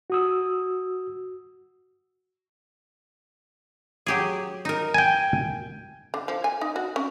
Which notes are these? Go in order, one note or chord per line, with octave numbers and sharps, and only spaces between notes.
F#4 D#6 E6
F#3 G4 G#4
D#4 A#4
G5 G#5
D3
F3
G#5
D#4
F#4
C#4